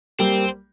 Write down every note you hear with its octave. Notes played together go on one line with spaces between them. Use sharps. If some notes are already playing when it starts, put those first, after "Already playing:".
G3 A#3 C4